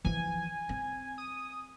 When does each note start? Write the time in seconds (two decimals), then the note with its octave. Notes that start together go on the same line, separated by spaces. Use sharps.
0.04 E3 F3 G#5
0.69 C4
1.18 D#6